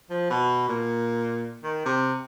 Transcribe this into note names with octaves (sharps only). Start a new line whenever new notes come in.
F3
B2
A#2
D#3
C3